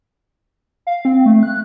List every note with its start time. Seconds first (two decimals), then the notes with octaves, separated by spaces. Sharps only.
0.87 F5
1.05 C4
1.26 A3
1.43 F#6